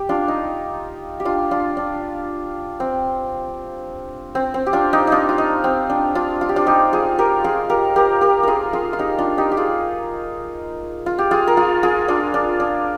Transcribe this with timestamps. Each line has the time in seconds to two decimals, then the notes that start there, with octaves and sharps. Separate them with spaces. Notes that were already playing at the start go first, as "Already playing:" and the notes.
Already playing: G4
0.09 D4 F4
0.28 D#4
1.20 G4
1.25 D4 F4
1.51 D4 F4
1.77 D4
2.80 C4
4.35 C4
4.54 C4
4.66 G4
4.73 D4 F4
4.93 D#4 G4
5.07 D4 D#4 F4
5.29 F4
5.38 D#4
5.64 C4
5.90 D4
6.15 D4 F4
6.41 F4
6.49 G4
6.56 D4 F4
6.66 D#4 G4
6.93 F4 G#4
7.18 G4 A#4
7.44 F4 G#4
7.69 G4 A#4
7.96 G4 A#4
8.21 G4 A#4
8.43 F4 G#4 A#4
8.73 F4 G#4
8.93 F4
8.99 D#4 G4
9.18 D4 F4
9.38 D#4 G4
9.51 G4
9.57 F4 G#4
11.06 F4
11.18 G4
11.31 F4 G#4
11.47 A#4
11.57 F4 G#4
11.83 F4 G#4
12.08 D4 F4
12.34 D4
12.60 D4